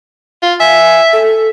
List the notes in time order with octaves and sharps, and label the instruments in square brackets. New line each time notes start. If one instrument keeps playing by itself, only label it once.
[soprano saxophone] F4
[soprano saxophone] E5 [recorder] G#5
[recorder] A4